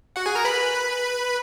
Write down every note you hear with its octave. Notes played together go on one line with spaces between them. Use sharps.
F#4 F#5
G#4 G#5
A#4 A#5
B4 B5